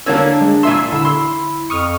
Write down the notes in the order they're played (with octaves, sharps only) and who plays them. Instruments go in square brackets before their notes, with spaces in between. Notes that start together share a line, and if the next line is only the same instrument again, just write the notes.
[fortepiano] D3 A#3 C#4 [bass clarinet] D4 [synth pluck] E6 G#6 A6
[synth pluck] G#3
[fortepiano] A#2 E5 C6 [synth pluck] G#5 E6
[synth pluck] D3 E6 [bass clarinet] E4
[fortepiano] C6
[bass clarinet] F2 [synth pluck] C#6 D#6 F6